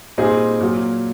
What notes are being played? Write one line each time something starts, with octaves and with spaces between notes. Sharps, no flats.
A#2 G3 C4 D#4 G#4
A#2 F#3 A#3